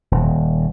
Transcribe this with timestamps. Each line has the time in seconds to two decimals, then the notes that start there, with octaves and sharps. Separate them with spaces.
0.11 D#1